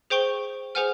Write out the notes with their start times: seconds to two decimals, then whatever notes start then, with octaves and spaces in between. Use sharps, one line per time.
0.10 G#4 C5 G5 C#6 G7
0.75 G#4 B4 C5 F#5 G#5 F6